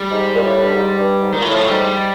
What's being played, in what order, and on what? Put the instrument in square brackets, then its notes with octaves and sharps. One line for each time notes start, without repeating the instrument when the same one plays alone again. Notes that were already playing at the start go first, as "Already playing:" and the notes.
Already playing: [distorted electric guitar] G3
[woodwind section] G#2
A#2
A2
G2
G#2
G2
G#2
[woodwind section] A#2 [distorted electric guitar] D#3
[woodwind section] A2 [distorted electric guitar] E3
[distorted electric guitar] F3
F#3
[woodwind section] G#2 [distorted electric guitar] G3